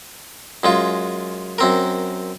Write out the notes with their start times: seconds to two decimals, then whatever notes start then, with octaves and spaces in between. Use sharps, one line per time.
0.64 F#2 G#3 F4
1.58 F#2 C4 A#4